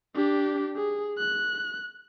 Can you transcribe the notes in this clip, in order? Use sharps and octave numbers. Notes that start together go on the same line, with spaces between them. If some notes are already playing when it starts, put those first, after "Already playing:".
D4 G4
G#4
F#6